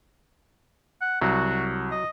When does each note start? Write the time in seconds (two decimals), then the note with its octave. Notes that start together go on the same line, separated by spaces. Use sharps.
1.01 F#5
1.22 C2 F#3 F#4
1.91 D#5